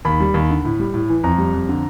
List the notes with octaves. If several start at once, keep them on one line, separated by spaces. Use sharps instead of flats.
D#2 B5
G3
D#2
D3
A2
G3
A2
E3
F2 A#5
G3
F2
D3